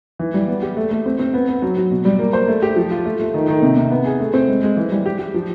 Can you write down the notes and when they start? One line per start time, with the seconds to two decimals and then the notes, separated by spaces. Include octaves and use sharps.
0.19 E3
0.34 G3
0.48 B3
0.62 G4
0.77 A3
0.91 A3
1.06 C4
1.19 C4
1.34 B3
1.49 B3
1.62 F#3
1.77 F#3
1.91 B2
2.05 G3
2.19 A#3
2.33 C5
2.48 A3
2.62 G4
2.76 F3
2.91 F4
3.05 A3
3.20 A3
3.34 D#3
3.48 D#3
3.62 C3
3.77 C3
3.91 B3
4.06 G#4
4.20 A3
4.34 C4
4.48 G#3
4.63 G#3
4.77 E3
4.92 G3
5.06 G4
5.19 G4
5.34 F3